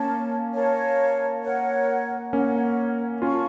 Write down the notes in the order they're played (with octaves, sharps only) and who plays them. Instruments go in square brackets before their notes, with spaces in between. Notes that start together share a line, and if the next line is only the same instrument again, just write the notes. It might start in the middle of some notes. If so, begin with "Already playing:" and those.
Already playing: [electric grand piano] A#3 C#4 [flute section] A#4 C#5 F5 A5
[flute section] A#4 C#5 F5 A5
A#4 C#5 F#5
[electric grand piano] A#3 C#4 [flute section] A#4 C#5 F#5
[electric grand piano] C#4 F4 [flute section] A#4 F5 A5 C#6